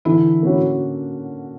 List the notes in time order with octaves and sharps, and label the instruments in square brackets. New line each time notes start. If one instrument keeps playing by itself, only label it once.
[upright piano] D3 [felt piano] E3 E4
[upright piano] A#3 C#4 F#4